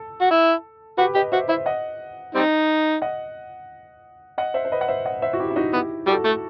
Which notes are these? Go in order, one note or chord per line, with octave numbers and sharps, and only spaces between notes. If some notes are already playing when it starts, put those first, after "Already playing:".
Already playing: A4
F#4
E4
F#4 G4 B4
G4 B4 D#5
F#4 C5 E5
E4 C5 E5
D#5 F#5
G3 C4 D#4
D#5 F#5
D#5 F#5
C5 E5
C5
B4 D#5
F#5
C5 E5
D#5 F#5
C5 E5
F#4
E4 G4
E4
D#4 F#4
B3 E4 G4
G3 F#4 A4
A3